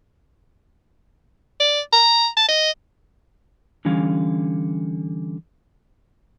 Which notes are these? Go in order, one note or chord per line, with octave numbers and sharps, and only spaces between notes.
D5
A#5
A5
D#5
D3 E3 G3 C#4 F5 G#5